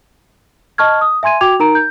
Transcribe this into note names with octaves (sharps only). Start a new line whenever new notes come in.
D#5 A5 C#6 F6 G#6
D#6
E5 G#5 C6 G#6 D#7
F#4 G5 D6 G#6 F7
D#4 A#4 A#5 D7
G6